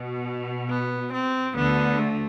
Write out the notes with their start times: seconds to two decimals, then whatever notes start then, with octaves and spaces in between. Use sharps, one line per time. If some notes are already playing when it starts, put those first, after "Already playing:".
Already playing: B2
0.70 B3
1.13 C4
1.55 D2 D3 B3
1.99 A3